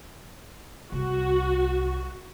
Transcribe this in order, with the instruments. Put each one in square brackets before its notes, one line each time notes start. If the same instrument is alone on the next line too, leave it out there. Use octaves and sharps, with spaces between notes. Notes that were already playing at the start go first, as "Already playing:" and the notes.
[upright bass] C2 [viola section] F#4